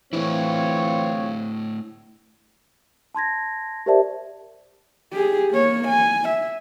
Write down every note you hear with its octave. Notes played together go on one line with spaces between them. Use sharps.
E3 A3 C4 D4 E4 F4 C#5
A5 C6 G#6 A#6
G4 A#4 C5 D5 E5 A5
G4 G#4
A#3 C#5
G#5
E5